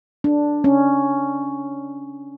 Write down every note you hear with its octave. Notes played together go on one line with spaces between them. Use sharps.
D4
C#4